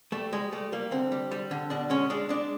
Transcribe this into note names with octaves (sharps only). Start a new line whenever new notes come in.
G3 A3
G3 G#3
G3 A3
G3 A#3
D3 C4
G3
G3
D3
B2 D4
G#3 C#4
G#3 D4
G#3 D4